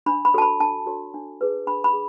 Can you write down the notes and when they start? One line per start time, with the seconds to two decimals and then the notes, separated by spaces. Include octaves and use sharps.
0.06 D4 B5
0.25 B5
0.34 F#4 A4 C#5 A5
0.42 B5
0.60 D4 A5
0.86 F#4 A4 C#5
1.14 D4
1.41 G#4 B4
1.67 D4 B5
1.84 B5
1.93 G#4